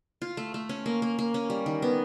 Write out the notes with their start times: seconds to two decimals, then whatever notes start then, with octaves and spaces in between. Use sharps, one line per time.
0.22 F4
0.37 A3
0.54 A3
0.69 C#4
0.86 A#3
1.02 A#3
1.19 A#3
1.34 C#4
1.50 G3
1.66 D#3
1.82 B3